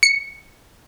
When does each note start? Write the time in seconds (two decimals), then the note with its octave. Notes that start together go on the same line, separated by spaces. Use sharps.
0.03 C#7